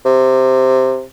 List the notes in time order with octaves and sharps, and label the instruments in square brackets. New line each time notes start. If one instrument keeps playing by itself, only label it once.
[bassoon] C3